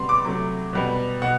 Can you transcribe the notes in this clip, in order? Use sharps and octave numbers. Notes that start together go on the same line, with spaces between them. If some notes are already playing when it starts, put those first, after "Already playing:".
Already playing: C3 G3 B3 B5 C6
D6
C3 F#3 A3
B2 G3 B3
B2 F#5